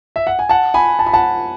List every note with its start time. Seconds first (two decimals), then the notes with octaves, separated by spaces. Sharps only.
0.16 E5
0.27 F#5
0.39 G#5
0.49 F#5 A5
0.74 G#5 B5
0.99 A5
1.07 B5
1.13 F#5 A5